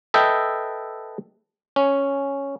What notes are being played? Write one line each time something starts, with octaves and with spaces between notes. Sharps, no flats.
A4 B4 D#5 E5 G5
C#4